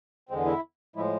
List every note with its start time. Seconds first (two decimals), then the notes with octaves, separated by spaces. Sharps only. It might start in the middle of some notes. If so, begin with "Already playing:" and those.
0.29 E2 D3 G#3 C4
0.46 E4
0.96 A2 F3 G#3 E4